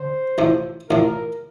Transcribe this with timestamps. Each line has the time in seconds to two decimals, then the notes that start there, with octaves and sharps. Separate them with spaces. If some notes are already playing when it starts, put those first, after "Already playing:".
Already playing: D3 C5
0.38 A1 A2 F3
0.90 A1 A2 F3 A#4